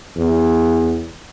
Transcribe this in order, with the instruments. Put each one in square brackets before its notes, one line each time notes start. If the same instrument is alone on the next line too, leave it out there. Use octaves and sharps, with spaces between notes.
[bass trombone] E2